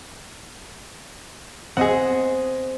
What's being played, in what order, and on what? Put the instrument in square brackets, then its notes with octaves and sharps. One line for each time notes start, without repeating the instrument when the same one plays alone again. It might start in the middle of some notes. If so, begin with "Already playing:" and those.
[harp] C4 [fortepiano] G#4 D#5 F#5